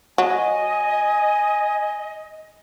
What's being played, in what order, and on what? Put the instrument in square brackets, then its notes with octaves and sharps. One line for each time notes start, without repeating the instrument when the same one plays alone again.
[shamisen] F#3 [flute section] D#5 [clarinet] G#5